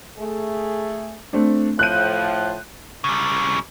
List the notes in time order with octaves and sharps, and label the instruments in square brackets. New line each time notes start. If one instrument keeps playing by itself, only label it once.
[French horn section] A3 G#4
[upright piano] A3 C4 D4
[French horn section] A2 F3 [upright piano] F#6 G6 D#7
[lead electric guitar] C#3 G3